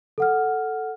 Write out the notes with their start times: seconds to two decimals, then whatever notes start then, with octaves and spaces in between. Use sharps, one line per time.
0.18 A4 F#5 F6